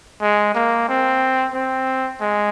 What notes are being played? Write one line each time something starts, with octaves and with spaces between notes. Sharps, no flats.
G#3
A#3
C4
C4
G#3